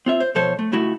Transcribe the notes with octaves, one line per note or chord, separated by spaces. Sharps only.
C4 F4 E5
C5
B2 F3 A4 C5 C#5
A3
C#2 A3 E4 F#4